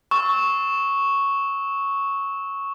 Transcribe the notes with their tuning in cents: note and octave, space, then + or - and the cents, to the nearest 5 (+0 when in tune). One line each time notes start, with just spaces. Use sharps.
C#6 +0 E6 -30